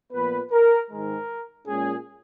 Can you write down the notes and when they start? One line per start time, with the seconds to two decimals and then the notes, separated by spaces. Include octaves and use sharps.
0.12 A#2 F3 B3 B4
0.51 A#4
0.89 G#2 D#3 G#3 A#4
1.67 A#2 G#3 C#4 G#4